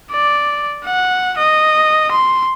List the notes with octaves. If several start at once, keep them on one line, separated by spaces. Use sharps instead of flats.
D5
F#5
D#5
C6